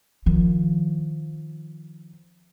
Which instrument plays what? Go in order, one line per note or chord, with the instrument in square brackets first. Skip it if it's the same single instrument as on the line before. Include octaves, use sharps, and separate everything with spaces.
[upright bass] D#3 F3